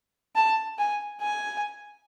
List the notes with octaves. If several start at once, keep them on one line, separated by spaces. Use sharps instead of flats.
A5
G#5
G#5